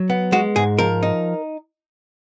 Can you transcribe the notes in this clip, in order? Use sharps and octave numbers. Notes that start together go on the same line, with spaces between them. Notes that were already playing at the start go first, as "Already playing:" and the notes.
Already playing: F#3
B3
G#3 F#4
G#2 G#4
F3 A#4
D#4